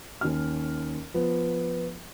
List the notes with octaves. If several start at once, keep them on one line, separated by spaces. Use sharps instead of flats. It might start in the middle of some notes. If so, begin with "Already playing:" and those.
D#2 C#4 F6
F3 B3